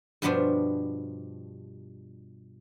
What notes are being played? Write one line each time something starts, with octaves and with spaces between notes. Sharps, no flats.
G2 B2 F3 B3 D4 C5